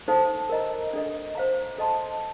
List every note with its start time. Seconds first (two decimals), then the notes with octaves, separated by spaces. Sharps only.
0.08 D#4 A4 C5 F5
0.50 A#4 D#5 A#5
0.93 D4 A4 D#5
1.35 C5 F5 A#5
1.78 A4 D#5 A5 C6